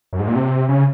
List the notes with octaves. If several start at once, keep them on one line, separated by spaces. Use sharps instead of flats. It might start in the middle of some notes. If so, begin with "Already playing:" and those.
F#2
G#2
A#2
C3
C#3